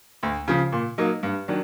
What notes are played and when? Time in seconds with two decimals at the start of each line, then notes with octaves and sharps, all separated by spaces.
0.23 D2
0.48 C#3 F3
0.72 A#2
0.98 F#3 A#3 D#4
1.23 G2
1.48 D#3 F#3 D4